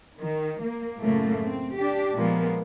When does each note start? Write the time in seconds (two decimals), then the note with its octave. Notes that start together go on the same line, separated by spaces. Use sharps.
0.19 D#3
0.61 A#3
1.00 F#2 A2 C#3 A3 A#3
1.47 C4
1.77 D4 G4
2.14 A#2 F3 G#3 A#3 B3